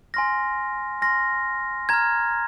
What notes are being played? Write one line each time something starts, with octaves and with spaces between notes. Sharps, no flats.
G#5 C6 F6 A#6
G#5 C6 F6 A#6
A#5 F6 G#6